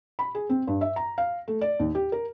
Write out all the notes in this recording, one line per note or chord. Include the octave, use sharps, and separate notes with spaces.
B5
G#4
C4
G2
E5
A#5
F5
A3
D5
D#2
G4
A#4